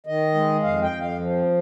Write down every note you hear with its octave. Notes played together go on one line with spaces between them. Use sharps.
D#3 D#5
G#3
F2 F5
G5
F2
F5
F3